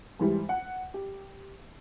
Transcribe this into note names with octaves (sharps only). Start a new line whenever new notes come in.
G#2 E3 G3
F#5
G4